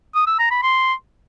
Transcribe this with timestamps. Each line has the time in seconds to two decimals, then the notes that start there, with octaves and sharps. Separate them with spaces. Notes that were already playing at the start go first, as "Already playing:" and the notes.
0.15 D#6
0.27 E6
0.39 A#5
0.51 B5
0.63 C6